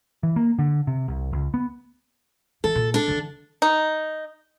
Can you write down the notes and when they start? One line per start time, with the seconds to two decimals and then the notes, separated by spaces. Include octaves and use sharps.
0.23 E3
0.36 A#3
0.59 D3
0.87 C3
1.08 C2
1.33 C#2
1.54 B3
2.64 E3 A4
2.75 A#2
2.94 D4 A4
3.08 D3 E3
3.62 D#4